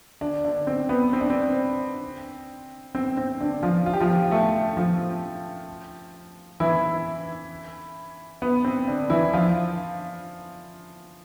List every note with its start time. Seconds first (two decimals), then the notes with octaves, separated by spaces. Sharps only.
0.21 D3 D4
0.44 D3 D4
0.67 C4
0.89 B3
1.13 C4
1.21 D4
1.30 C4
2.95 C4
3.17 C4
3.41 D3 D4
3.63 F3 F4
3.86 F4
3.93 G4
4.00 F3 F4
4.31 A3 A4
4.77 F3 F4
6.60 E3 E4
8.42 B3
8.65 C4
8.87 D3 D4
9.10 E3 E4
9.33 F3 F4